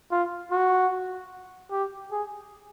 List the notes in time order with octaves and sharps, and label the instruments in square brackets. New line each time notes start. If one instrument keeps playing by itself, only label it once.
[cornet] F4
F#4
G4
G#4